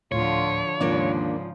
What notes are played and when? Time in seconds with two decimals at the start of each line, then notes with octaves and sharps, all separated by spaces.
0.12 D2 A2 D3 F3 F4 C#5
0.81 D#2 G#2 C#3 F3 A#3 D4 F4 D5